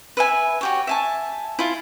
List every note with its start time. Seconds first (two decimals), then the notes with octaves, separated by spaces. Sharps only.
0.17 B4 E5 G#5
0.61 F#4 G4 C#5
0.87 E5 G#5 A5
1.59 E4 F4